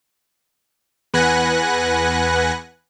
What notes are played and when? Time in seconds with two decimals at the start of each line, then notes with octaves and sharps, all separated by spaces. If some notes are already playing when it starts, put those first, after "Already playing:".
1.14 E2 B4 F#5 G#5 F#6 A#6